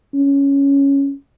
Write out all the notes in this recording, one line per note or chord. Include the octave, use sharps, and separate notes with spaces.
C#4